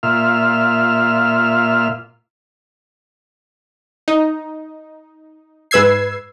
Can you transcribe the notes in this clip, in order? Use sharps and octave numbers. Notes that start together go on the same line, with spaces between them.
A#2 F4 E5 F6
D#4
G#2 B4 E6 G#6 C7